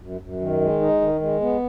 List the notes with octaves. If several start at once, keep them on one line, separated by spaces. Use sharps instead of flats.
F#2
F#2
D#3
G#3
D#4
D#3
G#3
B3